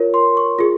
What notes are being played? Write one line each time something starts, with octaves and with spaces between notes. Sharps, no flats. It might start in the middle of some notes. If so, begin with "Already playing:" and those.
Already playing: F4 A#4 C#5
C6
C#6
F4 G#4